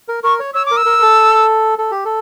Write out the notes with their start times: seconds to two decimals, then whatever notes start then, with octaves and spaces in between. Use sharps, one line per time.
0.08 A#4
0.24 A#4 C#6
0.40 C#5
0.54 C#5 E6
0.66 A#4 D6
0.77 E6
0.86 A#4
1.02 A4
1.78 A4
1.91 G4
2.05 A4